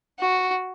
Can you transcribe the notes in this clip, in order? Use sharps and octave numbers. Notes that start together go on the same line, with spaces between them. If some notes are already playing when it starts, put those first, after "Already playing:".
F#4